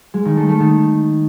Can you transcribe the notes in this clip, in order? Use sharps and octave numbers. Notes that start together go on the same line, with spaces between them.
G#3
D#3
A3
A3
D#3